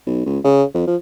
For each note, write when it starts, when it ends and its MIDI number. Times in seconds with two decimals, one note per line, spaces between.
0.06 0.25 35
0.26 0.39 37
0.44 0.63 49
0.74 0.84 41
0.87 0.96 53